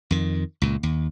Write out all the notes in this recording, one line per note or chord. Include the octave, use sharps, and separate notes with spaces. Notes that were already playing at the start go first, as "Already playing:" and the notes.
F2 D#3
C#2 A#2
D#2